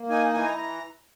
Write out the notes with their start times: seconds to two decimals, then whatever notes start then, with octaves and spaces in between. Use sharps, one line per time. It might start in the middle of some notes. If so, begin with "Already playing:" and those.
Already playing: A#3
0.10 D#4 G#5
0.33 E3 G#5
0.45 A#5
0.57 A#5